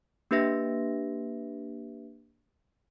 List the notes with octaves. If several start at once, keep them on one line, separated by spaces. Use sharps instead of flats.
A#3 D4 G4 B4 E5 A#6